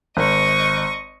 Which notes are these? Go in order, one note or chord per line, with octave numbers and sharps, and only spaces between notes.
G#1 D#5 C#6